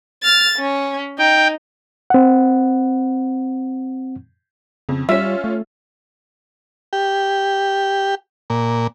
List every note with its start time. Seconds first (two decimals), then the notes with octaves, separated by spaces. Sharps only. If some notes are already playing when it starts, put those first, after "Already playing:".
0.23 F6 A6
0.58 C#4
1.18 D#4 G5
2.10 C4 F#5
4.89 F2 C#3
5.09 G3 C#4 F4 E5
5.44 A3
6.93 G4
8.50 A#2